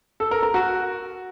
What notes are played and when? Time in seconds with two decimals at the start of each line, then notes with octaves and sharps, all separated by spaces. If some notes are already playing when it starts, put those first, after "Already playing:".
0.20 A4
0.31 A#4
0.43 A#4
0.54 F#4